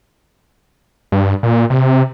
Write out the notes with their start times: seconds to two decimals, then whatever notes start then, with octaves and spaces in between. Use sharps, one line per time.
1.12 G2
1.43 A#2
1.70 C3